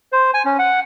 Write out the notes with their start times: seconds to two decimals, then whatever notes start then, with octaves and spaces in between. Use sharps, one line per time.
0.12 C5
0.34 G#5
0.45 C#4
0.59 F#5